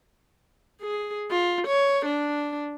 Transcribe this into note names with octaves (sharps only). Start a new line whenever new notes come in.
G#4
F4
C#5
D4